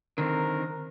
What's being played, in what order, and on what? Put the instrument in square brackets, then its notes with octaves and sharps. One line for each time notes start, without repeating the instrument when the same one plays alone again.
[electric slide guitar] D3 D#3 C4 [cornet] A#4